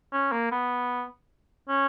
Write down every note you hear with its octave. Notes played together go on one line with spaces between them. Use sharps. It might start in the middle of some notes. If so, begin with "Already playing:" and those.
C#4
A#3
B3
C#4